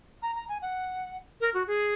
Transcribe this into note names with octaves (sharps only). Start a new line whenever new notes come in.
A#5
A#5
G#5
F#5
A#4
F#4
G#4